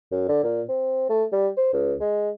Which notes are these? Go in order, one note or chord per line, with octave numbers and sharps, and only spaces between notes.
F#2
D3
A#2
C4
A3
G3
C5
C#2
G#3